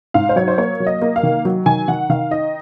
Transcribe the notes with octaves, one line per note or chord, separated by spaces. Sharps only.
G#2 F5
C5
F#3 C#5
C5
A#3 C#5
F#3
D#5
A#3
F5
D#3
F#3
D#3 G#5
D#3 F#5
D#3 F5
D#4 D#5